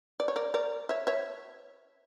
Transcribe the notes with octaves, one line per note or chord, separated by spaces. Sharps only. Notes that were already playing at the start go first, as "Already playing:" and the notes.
D5
C#5
A#4 D5
A#4 D5
C#5 E5
C#5 E5